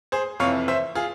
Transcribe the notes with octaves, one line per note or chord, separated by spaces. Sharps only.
G#4 C5
F2 C3 E3 C#5 F5
C5 E5
F4 G#4